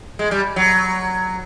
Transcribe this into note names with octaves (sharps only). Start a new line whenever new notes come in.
G#3
G3
F#3